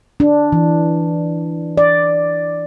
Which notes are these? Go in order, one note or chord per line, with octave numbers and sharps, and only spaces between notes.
D4
E3
D5